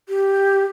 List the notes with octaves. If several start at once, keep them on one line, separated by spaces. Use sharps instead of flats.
G4